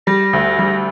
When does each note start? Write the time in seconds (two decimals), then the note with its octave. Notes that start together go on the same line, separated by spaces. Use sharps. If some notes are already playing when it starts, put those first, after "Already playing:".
0.07 G3 A#6
0.33 D2
0.59 G3